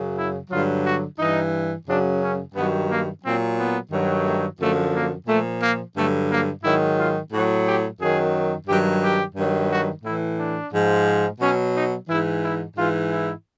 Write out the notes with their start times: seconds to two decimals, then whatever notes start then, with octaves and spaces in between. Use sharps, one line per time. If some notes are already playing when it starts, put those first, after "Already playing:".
Already playing: F#2 C#3 F#3
0.17 E4
0.50 G2 D3 F#3 F4
0.84 F#4
1.19 G2 E3 D#4
1.87 F#2 C#3 F#3 D4
2.21 C#4
2.54 G2 D#3 F#3 B3
2.88 A#3
3.23 A#2 F#3 C4
3.57 B3
3.91 G2 D#3 F#3
4.24 A3
4.59 F#2 D3 F3 A3
4.93 A#3
5.27 A#2 F3 A3
5.61 A#3
5.96 G2 D3 F#3 A3
6.29 A#3
6.63 G#2 D#3 F#3 E4
6.97 F4
7.32 A2 F#3 F#4
7.66 G4
7.99 F#2 D#3 F#3 G#4
8.67 G2 D#3 F#3 G4
9.02 G4
9.35 G2 D#3 F#3
9.70 F#4
10.03 A2 E3 E4
10.38 D4
10.72 G#2 F3
11.41 B2 F#3 C#4
11.74 D#4
12.08 G#2 E3 E4
12.42 E4
12.76 G#2 E3 F4
13.10 E4